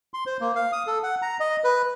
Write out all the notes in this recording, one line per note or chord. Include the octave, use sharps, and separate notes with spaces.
C6
C5
A#3
F5
D#6
A4
F#5
A#5
D#5
B4